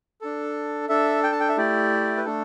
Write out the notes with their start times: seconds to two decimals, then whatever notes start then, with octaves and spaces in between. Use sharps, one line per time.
0.21 D4 A4
0.89 D4 A4 E5
1.24 G5
1.32 A5
1.40 G5
1.49 E5
1.57 A3 E4 G4 D5
2.17 B4
2.25 A3 D4 A4